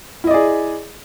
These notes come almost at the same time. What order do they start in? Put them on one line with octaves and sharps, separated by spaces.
E4 D#5 D5 G#4